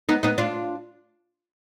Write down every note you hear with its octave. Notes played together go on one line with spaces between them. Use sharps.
B3 D#4
B3 D#4
D4 F4